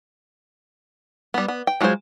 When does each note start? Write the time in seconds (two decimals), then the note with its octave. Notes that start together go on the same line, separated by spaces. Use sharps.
1.34 G3 B3
1.48 B3
1.67 G5
1.81 F#3 G#3 F4 G#4 C5